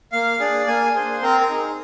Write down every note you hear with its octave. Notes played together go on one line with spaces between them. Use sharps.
A#3 F5
D4 G#4 D5
A#3 G#5
D4 G#4 C5
C4 A#4
A#4
D#4 G#4